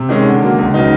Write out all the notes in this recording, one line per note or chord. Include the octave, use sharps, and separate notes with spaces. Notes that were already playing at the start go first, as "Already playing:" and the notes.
Already playing: C3
D#3 G#3 C#4
D3
F#3 A#3
C#2
C#3 F#3 B3 D#4